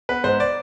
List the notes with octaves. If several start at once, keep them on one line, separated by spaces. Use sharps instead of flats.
B3 B4
G#2 C5
D5